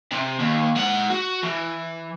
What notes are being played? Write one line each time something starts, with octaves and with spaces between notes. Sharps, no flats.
C3
D#2
G#3 F#5
F#4
E3